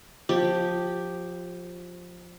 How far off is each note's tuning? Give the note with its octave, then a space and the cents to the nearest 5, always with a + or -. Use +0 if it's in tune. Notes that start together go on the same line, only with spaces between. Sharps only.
F3 +20 G4 +0